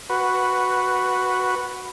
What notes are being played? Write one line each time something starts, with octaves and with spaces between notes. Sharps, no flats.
F#4 B4